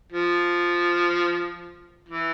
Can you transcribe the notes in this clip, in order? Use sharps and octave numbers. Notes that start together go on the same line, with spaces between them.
F3
E3